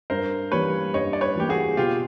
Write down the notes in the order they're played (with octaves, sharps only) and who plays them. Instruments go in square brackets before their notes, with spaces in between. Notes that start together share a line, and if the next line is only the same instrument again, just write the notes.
[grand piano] G2 [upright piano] A#4 C5
[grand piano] E3 G3 A#3 [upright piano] B4 C#5
[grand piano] G2 [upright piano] C#5 D#5
[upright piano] D5
B4 C#5
[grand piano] E3 G3 A#3 [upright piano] G4
[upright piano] F#4 G#4
[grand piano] B2 [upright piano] F4 G4